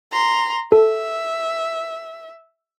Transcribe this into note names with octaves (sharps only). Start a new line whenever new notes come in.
A#5 C6
A4 E5